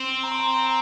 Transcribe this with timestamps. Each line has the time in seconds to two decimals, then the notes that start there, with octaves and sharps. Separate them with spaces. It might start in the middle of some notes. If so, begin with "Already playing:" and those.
Already playing: C4
0.23 A#5
0.31 C6
0.40 A#5
0.66 A#5